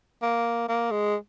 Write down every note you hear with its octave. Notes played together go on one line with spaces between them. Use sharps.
A#3
A#3
G#3